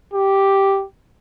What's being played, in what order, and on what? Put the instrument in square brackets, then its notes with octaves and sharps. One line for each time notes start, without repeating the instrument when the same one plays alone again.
[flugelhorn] G4